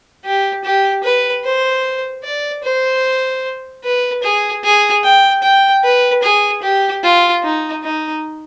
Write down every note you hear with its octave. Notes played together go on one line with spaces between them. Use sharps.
G4
G4
B4
C5
D5
C5
B4
G#4
G#4
G5
G5
B4
G#4
G4
F4
D#4
D#4